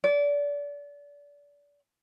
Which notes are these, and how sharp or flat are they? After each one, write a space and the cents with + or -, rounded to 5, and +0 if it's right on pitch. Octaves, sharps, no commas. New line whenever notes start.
D5 -30